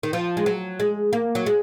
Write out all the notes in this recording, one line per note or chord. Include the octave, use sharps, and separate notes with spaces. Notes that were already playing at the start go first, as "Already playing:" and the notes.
D#3
F3
G#3
F#3
G#3
A#3
F#3
G#3